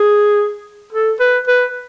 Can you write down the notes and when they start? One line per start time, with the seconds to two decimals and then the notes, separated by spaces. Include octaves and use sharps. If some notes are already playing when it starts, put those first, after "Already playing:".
Already playing: G#4
0.93 A4
1.20 B4
1.47 B4